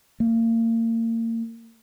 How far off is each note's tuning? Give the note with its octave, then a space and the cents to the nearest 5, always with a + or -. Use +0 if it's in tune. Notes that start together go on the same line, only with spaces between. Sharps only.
A#3 -35